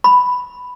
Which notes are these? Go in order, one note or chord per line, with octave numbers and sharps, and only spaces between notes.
B5